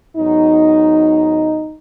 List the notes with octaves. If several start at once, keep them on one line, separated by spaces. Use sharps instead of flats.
G#2 F#3 B3 D#4